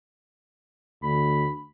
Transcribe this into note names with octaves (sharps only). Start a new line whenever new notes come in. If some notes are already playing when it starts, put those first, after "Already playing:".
D2 B5